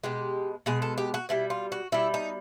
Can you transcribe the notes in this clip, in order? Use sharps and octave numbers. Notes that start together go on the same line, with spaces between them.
B2 G#3 G4
B2 G#3 G#4
A4
G4
F#4
B2 G3 E4
F4
F#4
B2 G3 E4
D#4